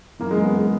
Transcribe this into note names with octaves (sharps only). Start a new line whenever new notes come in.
F#2 E3 A#3
G#3
B3
G#3